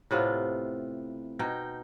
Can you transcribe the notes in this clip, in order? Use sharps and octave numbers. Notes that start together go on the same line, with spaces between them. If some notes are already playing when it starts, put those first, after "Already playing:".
A2 C3 B3 F4
B2 D#4 G5